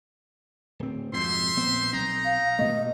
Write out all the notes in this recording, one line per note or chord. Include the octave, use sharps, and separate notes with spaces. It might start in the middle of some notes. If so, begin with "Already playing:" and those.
D1 C4
F2 G#2 B2 C5 E5 C6
A#1 B3 C4
B1 C4 D#4 A#5
F5
G2 A#2 A3 D#5